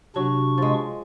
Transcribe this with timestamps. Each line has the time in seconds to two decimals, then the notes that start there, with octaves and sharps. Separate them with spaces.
0.16 C3 F#3 D4 C#6
0.58 F3 G#3